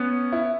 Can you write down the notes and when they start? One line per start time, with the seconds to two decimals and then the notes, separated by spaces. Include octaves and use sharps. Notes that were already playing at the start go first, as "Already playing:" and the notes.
Already playing: B3 C#4
0.32 E4